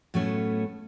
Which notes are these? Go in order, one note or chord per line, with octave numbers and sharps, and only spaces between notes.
A2 F#3 A3 B3 C#4 C#5